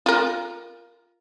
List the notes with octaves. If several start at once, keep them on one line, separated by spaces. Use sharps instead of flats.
F4 A#4